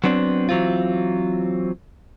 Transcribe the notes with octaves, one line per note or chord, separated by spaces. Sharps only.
F#3 B3 C4 D4
E3 F#3 C4 F4